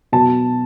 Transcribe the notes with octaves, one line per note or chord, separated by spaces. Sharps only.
B2 F#3 A5